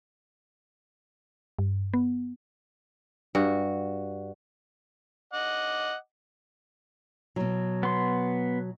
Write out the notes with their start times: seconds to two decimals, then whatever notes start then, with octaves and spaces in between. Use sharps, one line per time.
1.59 G2
1.94 B3
3.35 G2 F#4
5.33 D#5 F#5 D6
7.36 B2 F#3
7.83 B3 C6